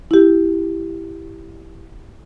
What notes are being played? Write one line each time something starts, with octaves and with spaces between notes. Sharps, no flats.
E4 G4